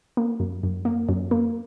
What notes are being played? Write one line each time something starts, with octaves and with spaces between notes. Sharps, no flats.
A#3
F#2
F#2
A#3
F#2
A#3